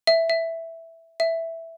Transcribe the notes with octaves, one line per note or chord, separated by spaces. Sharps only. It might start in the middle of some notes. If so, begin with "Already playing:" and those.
E5
E5
E5